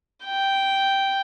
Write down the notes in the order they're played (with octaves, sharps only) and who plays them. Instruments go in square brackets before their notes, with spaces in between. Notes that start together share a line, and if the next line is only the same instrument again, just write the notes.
[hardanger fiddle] G5